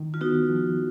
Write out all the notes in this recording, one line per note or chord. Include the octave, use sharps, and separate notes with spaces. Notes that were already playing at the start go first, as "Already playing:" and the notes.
Already playing: D#3
F4
B3 D#4 F#4
F3